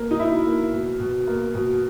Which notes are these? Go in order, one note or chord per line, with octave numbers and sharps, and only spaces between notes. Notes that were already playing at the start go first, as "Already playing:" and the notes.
Already playing: A#3
D#4
B2 E4
A#3
B2
B2
A#3
B2